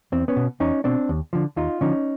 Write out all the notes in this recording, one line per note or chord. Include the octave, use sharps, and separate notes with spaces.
E2 C4
B3 C#4
B2
E2 C#4 D#4
B2 C4 D4
D#2
D3 F3
D#2 D#4 F4
D3 F3 C#4 D#4